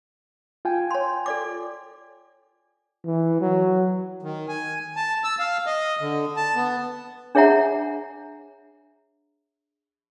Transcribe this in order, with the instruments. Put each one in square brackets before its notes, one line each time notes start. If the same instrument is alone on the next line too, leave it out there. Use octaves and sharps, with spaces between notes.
[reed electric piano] F4 G5 G#5
[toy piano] C#5 C6
A4 D5 D6
[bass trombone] E3
F#3
[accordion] D#3
G#5
A5
E6
F5
D#5
D3
A5
B3
[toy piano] D4 G#4 C#5 E5 F#5 A#5